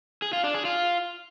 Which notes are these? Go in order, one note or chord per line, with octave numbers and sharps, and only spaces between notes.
G#4
F4
D4
G#4
F4